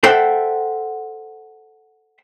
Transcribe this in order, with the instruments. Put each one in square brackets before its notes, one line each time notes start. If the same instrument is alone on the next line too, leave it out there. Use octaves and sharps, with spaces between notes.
[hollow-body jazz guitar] A4 C5 E5 F#5 G5